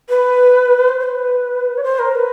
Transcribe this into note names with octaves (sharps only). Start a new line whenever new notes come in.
B4
C5
C5
B4
C#5
C5
A#4
B4